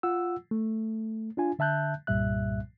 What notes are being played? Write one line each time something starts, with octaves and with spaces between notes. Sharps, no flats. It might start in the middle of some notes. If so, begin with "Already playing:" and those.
F4 F#5 E6
A3
D4 F4 G#5
D3 E5 A5 F#6 G6
C2 G2 A#2 G3 E5 F#6